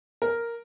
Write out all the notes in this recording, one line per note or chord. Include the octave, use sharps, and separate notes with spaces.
A#4